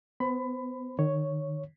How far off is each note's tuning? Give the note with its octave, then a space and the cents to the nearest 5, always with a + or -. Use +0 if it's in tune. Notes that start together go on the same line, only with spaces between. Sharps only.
B3 +25 C5 +0 B5 +20
D#3 -30 C#5 +0